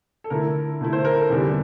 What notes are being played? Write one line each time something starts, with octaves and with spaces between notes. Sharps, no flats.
A4
D3 A3 E4 A#4
D3 A3 E4
C5
A#4
A4
E2 D3 G3 D4